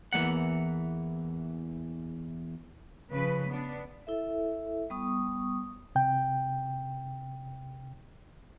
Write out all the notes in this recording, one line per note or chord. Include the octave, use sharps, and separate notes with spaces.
E2 E3 G#3 A#3 F#5
C#3 F3 B4
B3 D4
E4 A4 E5
G3 B3 C#6 D#6
C3 G5